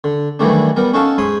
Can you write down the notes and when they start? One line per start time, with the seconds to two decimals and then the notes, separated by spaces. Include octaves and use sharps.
0.04 D3
0.39 D#3 E3 F#3 G3 A3 D4
0.76 G3 B3 A#4
0.93 C#4 D#4 F#4 A4 F5 A5
1.18 G#2 C#5 B5 C6 D#6